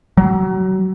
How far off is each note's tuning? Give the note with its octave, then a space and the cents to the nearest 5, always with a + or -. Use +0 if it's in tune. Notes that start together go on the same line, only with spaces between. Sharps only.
F#3 +25